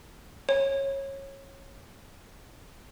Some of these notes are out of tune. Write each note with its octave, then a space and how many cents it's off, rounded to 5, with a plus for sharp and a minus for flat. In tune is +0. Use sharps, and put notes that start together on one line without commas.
C#5 -20